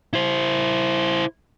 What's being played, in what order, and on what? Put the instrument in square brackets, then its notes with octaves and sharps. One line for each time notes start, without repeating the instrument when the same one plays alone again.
[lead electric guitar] E4 C5